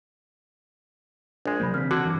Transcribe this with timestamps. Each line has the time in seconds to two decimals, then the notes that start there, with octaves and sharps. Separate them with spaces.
1.46 A#1 G#3 D4 G#5
1.60 C3 F#3 A#3 B5 G6
1.74 C#3 E3 C4 F6 B6
1.91 D3 F#4 G#6
2.05 G2 E3